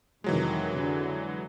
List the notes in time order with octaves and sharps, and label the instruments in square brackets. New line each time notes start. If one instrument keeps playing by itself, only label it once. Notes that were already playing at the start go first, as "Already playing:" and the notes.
[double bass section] F2 C3 D#3 [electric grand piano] E3 F#3 G#3
[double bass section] D3